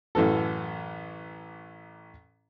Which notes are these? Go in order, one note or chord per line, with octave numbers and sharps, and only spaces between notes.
A1 F#2 E3 A4